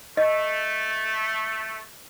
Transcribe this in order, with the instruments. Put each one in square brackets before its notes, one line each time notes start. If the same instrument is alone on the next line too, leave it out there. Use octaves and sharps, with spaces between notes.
[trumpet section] A3 [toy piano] D#5